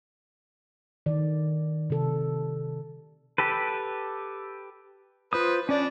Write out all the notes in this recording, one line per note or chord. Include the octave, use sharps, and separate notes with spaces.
D#3 D5
C3 A4
G4 A4 B4
F4 B4 C5 D#6
C#4 D4 D5